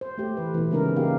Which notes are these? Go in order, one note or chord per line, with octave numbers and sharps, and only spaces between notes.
C5
A3 G4
E3 B4
B2 E3
C#3 G#3 C#4 D#4 A#4
A#3 D#4 G4 F5